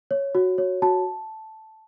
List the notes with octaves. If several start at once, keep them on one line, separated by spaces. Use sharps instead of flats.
C#5
F#4
C#5
F#4 A5